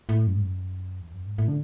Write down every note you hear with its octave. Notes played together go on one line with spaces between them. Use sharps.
A2
F#2
G#2
F#2
E2
F#2
G#2
A2
D3